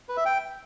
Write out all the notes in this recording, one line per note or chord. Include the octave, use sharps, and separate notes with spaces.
B4
E5
G5